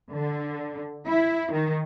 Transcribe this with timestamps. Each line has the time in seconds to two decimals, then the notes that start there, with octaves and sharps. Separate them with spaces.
0.12 D3
1.07 E4
1.52 D#3